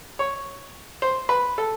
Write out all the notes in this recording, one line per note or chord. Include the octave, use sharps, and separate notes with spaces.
C#5
C5
B4
A4